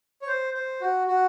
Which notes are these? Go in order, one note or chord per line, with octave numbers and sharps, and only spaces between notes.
C#5
C5
C5
F#4
F#4